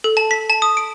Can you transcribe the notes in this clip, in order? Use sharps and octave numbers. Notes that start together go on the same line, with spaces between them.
A4
A5
B6
A5
D#6
D7